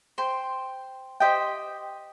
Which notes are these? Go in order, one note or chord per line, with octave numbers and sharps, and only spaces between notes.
C5 G5 C6
G4 C5 D#5 G5